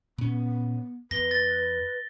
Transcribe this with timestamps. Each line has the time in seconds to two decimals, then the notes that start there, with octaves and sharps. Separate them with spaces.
0.18 A#2 B3 C#4
1.11 E2 B4 A#6 G7
1.31 A6